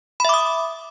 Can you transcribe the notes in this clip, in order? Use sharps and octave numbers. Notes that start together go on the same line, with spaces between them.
E5 B5 D6 D#6